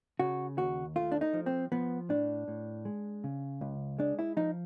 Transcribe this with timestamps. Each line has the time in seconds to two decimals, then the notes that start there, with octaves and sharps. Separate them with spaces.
0.20 C#3 F#4
0.58 D#2 F#4
0.96 A3 F4
1.12 D4
1.21 D#4
1.33 F3
1.46 C4
1.72 F3 B3
2.09 A2 D4
2.48 A2
2.85 G#3
3.24 C#3
3.61 C#2
3.98 G#3 D4
4.19 E4
4.37 F3 D#4